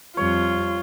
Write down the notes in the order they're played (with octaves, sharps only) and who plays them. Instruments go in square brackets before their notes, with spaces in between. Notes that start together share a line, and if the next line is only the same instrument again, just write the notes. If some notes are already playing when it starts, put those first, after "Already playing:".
[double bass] F2 G3 [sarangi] F4 [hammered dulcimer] C#5